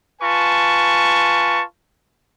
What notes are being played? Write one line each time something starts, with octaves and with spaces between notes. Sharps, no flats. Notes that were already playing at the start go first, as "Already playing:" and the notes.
F4 B4 G#5 A5 C#6